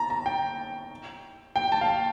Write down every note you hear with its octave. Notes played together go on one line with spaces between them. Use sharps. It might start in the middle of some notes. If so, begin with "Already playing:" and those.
Already playing: A5 A#5
A#5
G5
G5
A5
F5
G5